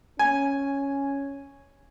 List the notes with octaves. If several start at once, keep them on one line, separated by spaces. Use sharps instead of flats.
C#4 G#5